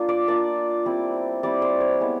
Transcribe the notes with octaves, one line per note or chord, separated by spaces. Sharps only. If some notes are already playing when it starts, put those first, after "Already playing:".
Already playing: A#3 D4 F4
D5
A#3 D4 F4 D5
G3 C4 E4
G3 C4 E4 D5
C5
C#5
G#3 B3 E4